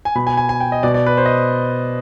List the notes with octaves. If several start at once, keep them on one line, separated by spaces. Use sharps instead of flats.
G#5
B2 B5
G#5
G#5
G#5
G5
D#5
B2 D5
D5
B4
C5
D#5